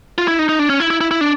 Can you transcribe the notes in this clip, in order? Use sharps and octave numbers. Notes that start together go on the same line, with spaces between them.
F4
E4
D#4
D#4
D4
C#4
E4
E4
E4
E4
D4